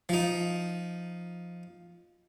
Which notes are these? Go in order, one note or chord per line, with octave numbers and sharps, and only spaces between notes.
F3 D#4